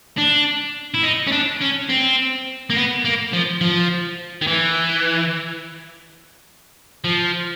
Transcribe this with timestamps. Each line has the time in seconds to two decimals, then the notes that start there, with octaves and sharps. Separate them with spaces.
0.18 D4
0.94 E4
1.03 D#4
1.27 C#4
1.32 D4
1.61 C#4
1.90 C4
2.70 A#3
2.76 B3
3.05 A#3
3.33 F3
3.61 F3
4.42 D#3
4.47 E3
7.05 F3